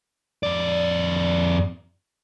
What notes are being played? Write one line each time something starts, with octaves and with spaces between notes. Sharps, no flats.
F2 D5